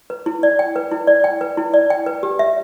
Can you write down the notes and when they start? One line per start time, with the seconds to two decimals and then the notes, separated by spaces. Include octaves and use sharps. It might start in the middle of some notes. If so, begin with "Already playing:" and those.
0.10 B4
0.26 E4
0.43 D5
0.59 G5
0.76 B4
0.91 E4
1.07 D5
1.24 G5
1.41 B4
1.57 E4
1.74 D5
1.90 G5
2.06 B4
2.23 G4
2.39 E5